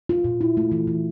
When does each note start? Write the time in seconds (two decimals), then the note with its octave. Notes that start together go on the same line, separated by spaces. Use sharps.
0.09 F4
0.24 A#2
0.41 E4
0.57 A3
0.72 E3
0.87 E3